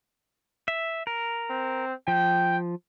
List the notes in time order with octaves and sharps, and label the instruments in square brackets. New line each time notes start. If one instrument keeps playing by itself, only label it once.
[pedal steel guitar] E5
A#4
[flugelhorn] C4
[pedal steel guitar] F3 [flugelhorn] G5